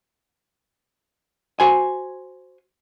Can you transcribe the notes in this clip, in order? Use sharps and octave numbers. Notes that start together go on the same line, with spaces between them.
F#4 C5 G#5